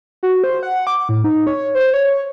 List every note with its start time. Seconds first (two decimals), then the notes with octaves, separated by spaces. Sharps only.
0.23 F#4
0.44 C5
0.63 F#5
0.87 D6
1.09 A2
1.24 D#4
1.47 C#5
1.75 C5
1.94 C#5